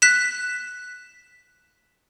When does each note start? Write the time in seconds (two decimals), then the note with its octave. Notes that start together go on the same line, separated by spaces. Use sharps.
0.02 F#6 B6 E7